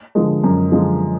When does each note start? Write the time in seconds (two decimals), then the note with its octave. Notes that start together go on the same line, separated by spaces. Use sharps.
0.15 D3 F3 G#3
0.44 F#2
0.71 D3 F3 G#3